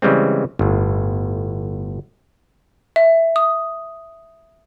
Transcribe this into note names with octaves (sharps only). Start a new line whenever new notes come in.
C#3 E3 G3 G#3 C4
G1 A2
E5
D#6